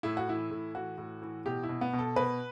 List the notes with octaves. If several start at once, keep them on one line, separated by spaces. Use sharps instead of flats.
A2 E4
F#4
E3 E4
A2
E3 F#4
A2
E3
B2 G4
E4
B2
B3
B2
A4
B2 B4